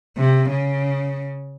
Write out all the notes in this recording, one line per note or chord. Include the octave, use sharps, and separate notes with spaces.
C3
C#3